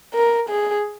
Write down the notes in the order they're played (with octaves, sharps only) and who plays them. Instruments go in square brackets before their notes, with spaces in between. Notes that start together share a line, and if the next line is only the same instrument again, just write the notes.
[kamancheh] A#4
G#4